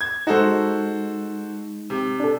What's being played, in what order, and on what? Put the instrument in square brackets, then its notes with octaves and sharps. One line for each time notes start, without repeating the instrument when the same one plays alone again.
[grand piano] G#6
[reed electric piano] G#3 D#4 [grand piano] F#4 A4 C5
[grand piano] C3
[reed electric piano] D4 A4